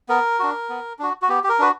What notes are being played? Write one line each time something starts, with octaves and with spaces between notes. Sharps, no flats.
B3 A#4
D4 F#4
B3
D4 F#4
F#4
B3 G4
G4
A#4
D4 F#4 B4